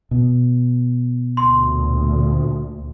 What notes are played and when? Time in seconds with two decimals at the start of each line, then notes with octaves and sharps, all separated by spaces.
0.11 B2
1.37 D2 A#2 C6